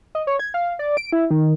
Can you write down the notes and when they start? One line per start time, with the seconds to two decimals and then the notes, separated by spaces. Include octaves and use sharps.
0.15 D#5
0.27 C#5
0.39 G#6
0.54 F5
0.79 D5
0.97 D7
1.12 E4
1.31 D#3